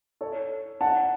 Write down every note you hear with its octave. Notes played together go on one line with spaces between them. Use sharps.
A4 C#5
F#5 A5